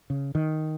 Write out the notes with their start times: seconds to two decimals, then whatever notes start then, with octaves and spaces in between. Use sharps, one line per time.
0.10 C#3
0.35 D#3